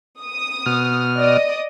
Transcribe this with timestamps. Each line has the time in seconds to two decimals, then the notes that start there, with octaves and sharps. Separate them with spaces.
0.22 D#6
0.66 B2 F6
1.18 D5 D#5 D#6